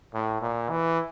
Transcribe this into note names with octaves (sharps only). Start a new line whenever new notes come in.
A2
A#2
E3